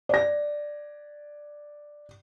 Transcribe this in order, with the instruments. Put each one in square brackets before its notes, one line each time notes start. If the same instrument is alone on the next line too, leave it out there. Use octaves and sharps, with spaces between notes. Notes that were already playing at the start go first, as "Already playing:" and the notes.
[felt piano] D5 A#6